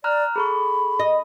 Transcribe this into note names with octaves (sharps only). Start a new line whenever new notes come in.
D5 A#5 F6 F#6
G#4 A4 B5 C#6
D#5